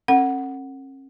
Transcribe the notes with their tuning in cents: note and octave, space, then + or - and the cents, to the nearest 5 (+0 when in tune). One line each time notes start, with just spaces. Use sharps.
C#4 -45 A#4 -40 F#5 +0